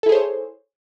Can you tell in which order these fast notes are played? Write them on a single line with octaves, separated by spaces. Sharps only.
A4 E4 G#4 C5 C#5